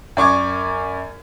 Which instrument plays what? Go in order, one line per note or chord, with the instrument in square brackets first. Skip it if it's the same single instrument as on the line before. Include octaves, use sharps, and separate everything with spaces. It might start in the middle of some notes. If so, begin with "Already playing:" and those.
[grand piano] F#2 D5 C#6 D6 G#6